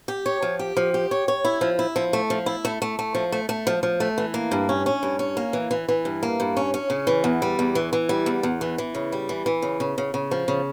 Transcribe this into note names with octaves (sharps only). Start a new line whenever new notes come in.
G4
C#5
F3
G4
F3
G4
C#5
C#5
E4
F3
E4
F3
A3
F3
E4
A3
A3
A3
F3
A3
A3
F3
F3
A3
E3
A#3
G2
C#4
C#4
G2
C#4
A#3
E3
E3
E3
G2
A#3
G2
C#4
C#4
C#3
E3
E2
G3
E2
E3
E3
G3
E2
E2
E3
E3
C#3
G3
E3
E3
C#3
C#3
C#3
C#3
F3
C#3